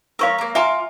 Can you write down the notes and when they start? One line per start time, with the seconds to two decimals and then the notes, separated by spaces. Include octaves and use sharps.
0.19 A#4 C5 C#5 F5 C#6 E6
0.38 A#3 A#5
0.55 F4 E5 F5 G#5 A#5 D6